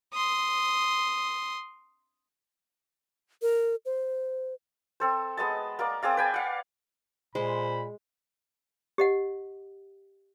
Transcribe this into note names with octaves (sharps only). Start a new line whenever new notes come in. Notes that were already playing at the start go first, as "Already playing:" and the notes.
C6 D#6
A#4
C5
C4 A4 C5
G#3 B3 D#5 A5
A#3 A#4 D5
C4 G#4 D5 F5
B4 G5 G#5
F5 F#5
A#2 G#3 C5 B5
G4 D#5 F#5